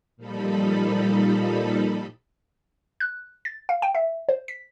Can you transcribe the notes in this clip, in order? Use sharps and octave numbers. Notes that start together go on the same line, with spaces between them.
A#2 F3 G3 D#4 A4 B5
F#6
A6
F5
G5
E5
C5
B6